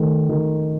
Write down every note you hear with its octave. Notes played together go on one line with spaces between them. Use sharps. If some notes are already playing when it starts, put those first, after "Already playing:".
Already playing: D#3 A3
D#3